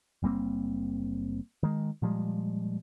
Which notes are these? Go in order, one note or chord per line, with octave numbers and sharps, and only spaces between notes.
F#1 G3 A#3 C4
D#3 G#3
A#2 F3 G3 G#3